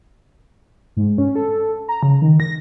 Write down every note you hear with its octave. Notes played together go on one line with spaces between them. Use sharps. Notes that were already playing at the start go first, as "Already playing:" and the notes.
G#2
C#4
A4
A#5
C#3
D#3
A#6